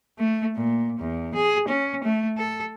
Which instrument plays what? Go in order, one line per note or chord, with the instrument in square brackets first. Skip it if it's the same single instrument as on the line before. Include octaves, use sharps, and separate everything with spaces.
[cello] A3
A#2
E2
G#4
C#4
A3
A4